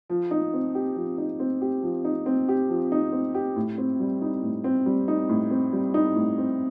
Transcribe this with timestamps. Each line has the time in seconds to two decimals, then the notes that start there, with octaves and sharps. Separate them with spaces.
0.10 F3
0.31 D#4
0.53 C4
0.75 G4
0.96 F3
1.18 D#4
1.39 C4
1.61 G4
1.82 F3
2.05 D#4
2.26 C4
2.48 G4
2.69 F3
2.92 D#4
3.12 C4
3.35 G4
3.56 A2
3.78 C4
4.00 G3
4.21 D#4
4.43 A2
4.64 C4
4.86 G3
5.08 D#4
5.29 A2
5.51 C4
5.73 G3
5.94 D#4
6.16 A2
6.38 C4